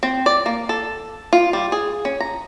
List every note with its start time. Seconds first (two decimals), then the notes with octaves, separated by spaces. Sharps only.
0.03 C4
0.26 D5
0.46 A#3
0.69 A4
1.33 F4
1.53 G3
1.72 G#4
2.05 C#4
2.20 A#5